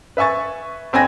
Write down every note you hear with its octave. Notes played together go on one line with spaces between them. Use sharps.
B4 E5 G#5 C#6 A6
G1 C4 G5 G#5 G#6 A#6